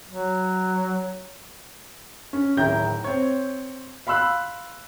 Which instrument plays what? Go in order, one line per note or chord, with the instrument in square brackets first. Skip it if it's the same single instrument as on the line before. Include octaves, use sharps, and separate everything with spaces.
[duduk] F#3
[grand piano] C#4
D1 D#3 E4 G5 A#5 G6
C4 C#5
F5 B5 C6 E6 F#6